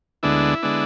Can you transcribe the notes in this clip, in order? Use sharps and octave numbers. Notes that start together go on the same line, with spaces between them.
D2 D3 G#3 B3 D4 E4
D3 G#3 B3 D4